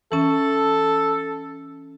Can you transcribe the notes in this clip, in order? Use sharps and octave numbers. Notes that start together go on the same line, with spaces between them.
E3 C#4 A4